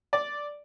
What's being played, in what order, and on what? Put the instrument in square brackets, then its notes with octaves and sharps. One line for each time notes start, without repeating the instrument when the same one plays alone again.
[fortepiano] D5